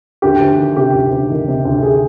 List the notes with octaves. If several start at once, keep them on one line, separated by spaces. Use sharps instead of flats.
D2 G4
D2
D#3
C3 G4
D2
D2
D#3
C3
D2
D2 G#4